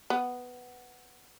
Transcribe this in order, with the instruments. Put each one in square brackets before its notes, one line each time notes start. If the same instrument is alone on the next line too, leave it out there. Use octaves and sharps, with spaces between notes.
[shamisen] B3